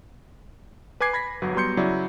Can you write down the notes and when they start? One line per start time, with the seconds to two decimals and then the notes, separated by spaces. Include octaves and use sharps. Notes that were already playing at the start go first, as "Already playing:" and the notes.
1.00 B4 G#5 D6 G#6 C7
1.13 B5 G#6 A#6 B6
1.42 G1 F#3 B4
1.55 F#3 G3 B3 C6 G6 C#7
1.77 C#3 F#3 E4 D5